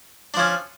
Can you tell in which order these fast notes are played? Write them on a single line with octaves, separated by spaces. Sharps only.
D4 F3 C#4